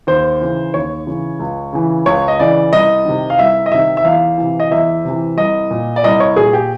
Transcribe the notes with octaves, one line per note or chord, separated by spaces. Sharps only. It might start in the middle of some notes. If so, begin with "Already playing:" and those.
D#2 C5
C#3 E3
D#2 C#5
C#3 E3
C#2
C#3 E3
C#2 C#5
D#5
C#3 E3 D5
C2 D#5
C3 D#3
F5
C2 E5
D#5
C3 D#3 E5
E5
E2 F5
C3 E3
D#5
E2 E5
C3 E3
C2 D#5
A#2
D5
C2 D#5
C#5
A#2 G#4
G4